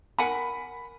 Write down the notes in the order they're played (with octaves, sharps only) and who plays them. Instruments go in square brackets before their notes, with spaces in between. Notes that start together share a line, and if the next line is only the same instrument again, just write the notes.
[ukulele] A#4 F#5 G#5 [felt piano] B5